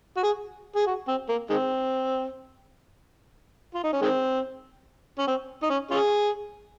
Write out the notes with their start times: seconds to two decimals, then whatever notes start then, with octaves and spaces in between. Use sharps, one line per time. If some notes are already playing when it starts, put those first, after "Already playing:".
0.17 F#4
0.23 G#4
0.76 G#4
0.87 F#4
1.08 C4
1.29 A#3
1.50 D#3 G#3 C4
3.74 F4
3.83 D#4
3.93 C#4
4.02 D#3 G#3 C4
5.18 C#4
5.27 C4
5.63 D#4
5.70 C#4
5.91 C#4 F4 G#4